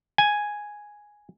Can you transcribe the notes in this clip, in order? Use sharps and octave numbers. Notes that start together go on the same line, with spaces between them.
G#5